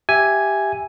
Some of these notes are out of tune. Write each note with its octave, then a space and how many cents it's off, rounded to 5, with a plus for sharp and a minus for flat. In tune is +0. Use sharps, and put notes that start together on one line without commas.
G4 +0 E5 +0 G#5 +0